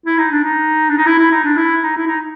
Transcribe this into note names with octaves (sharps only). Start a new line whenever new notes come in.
E4
D#4
D4
D#4
D4
D#4
E4
E4
D#4
D4
E4
D#4
E4
D#4